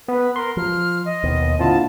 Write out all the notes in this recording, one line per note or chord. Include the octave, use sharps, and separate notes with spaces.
B3 B4
A#4 C6
F3 F6
D#5
D#2 B2
A#2 D3 C4 E4 F4 A5